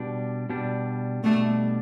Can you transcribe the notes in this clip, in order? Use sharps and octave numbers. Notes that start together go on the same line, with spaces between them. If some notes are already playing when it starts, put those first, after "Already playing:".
Already playing: B2 G3 D4
B2 G3 D4
B2 G3 A3 D4